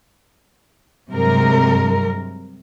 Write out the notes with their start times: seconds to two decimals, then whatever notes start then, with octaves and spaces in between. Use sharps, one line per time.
1.10 G2 C3 F#3 G#3 A#4